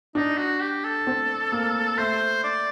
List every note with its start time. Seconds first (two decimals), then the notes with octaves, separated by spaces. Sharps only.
0.15 D4 D#4
0.38 F#4
0.61 G4
0.84 A4
1.07 C4
1.52 A#3
1.98 A3 C5
2.44 D5